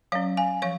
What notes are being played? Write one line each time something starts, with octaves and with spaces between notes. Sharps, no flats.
F#3 C#4 C#5 F5
F5 G#5
F3 C#5 F5